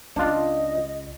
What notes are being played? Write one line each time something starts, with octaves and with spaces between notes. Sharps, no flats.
C#2 D4 F4 D#5